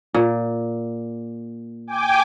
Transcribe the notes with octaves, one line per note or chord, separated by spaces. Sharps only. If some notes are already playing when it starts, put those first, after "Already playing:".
A#2
G5 G#5 D6